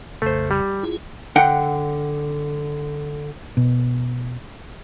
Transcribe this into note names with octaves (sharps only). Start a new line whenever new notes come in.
A#1 F2 C#3 A3 C5
G3
E4 F4 G#4
D3 F#5 G5
B2